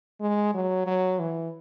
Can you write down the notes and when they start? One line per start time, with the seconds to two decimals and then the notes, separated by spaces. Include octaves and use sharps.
0.20 G#3
0.54 F#3
0.86 F#3
1.19 E3